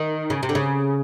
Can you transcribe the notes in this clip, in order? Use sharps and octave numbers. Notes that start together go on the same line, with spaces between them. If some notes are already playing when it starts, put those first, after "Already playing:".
Already playing: D#3
C#3
C3
D3
C#3